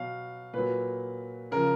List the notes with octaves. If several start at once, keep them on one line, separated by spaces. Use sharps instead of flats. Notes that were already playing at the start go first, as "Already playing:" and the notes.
Already playing: B2 F#3 F5
A#2 F#3 B4
C#3 F3 A#4